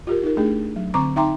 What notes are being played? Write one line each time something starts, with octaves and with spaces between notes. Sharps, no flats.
F4 G4 A#4
D#4 A#4
A3 D4 G#4
F#3
D3 C4 A#5 C#6 D6
D#4 E5 G5 A#5 C6 D6